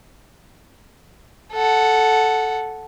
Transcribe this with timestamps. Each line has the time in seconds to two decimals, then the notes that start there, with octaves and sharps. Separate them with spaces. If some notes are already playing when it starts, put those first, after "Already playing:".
1.53 A4 F#5